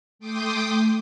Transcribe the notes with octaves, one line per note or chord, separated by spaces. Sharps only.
A3 G5 C6 D6 D#6 G6